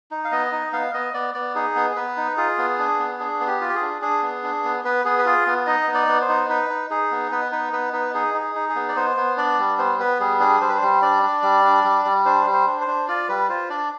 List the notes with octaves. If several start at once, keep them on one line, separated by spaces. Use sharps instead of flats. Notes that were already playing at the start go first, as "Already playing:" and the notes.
D#4
F5
B3 D#5
D#4
B3 F5
B3 D#5
B3 D5
B3 D5
D#4 G#4
B3
G#4
B3 B4
D#4
F4 G#4
B3
D4
B3
D4 G#4
B3
G4
F4
G4
G#4
D4
D4 G#4
B3
D4
B3
B3 B4
B3 G#4
B4
F4 G#4
B3
D#4 D#5
B3
D5
B3
C5
D#4
D#4 B4
D#4
D#4 G#4
B3
B3 B4
D#4 B4
B3 B4
D#4 B4
D#4 G#4
D#4
G#4
D#4
G#4
B3
D5
B3 C5
B3
D4 D5
G3
B3 C5
B3 B4
G3 G#4
D4 G#4
G3 C5
B4
C5
G3
D4 D5
D4
G3
D4
G3
G3
D4 C5
G3
C5
D4
C5
D4
F4 D5
G3 B4
F4 C5
D4 D5